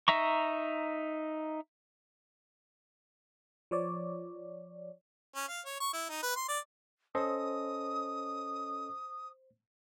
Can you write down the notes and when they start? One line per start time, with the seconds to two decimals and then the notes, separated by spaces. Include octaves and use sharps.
0.08 D#4 E5 A#5 C#6
3.71 F3 C#5 D5
5.36 C#4
5.48 F5
5.66 C#5
5.80 C#6
5.94 E4
6.10 D#4
6.23 B4
6.36 C6
6.48 D5
7.15 C#4 A4 C5 D#5 D#6